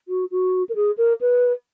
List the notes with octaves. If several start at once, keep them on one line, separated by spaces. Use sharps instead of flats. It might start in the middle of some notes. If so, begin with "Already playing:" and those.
F#4
F#4
A#4
G#4
A#4
B4